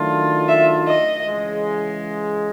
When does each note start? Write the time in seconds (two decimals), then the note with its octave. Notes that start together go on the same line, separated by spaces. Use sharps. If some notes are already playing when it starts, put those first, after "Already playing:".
Already playing: D#3 F#3 A3 D4 F4
0.48 E5
0.87 D#5
1.27 C#3 E3 G#3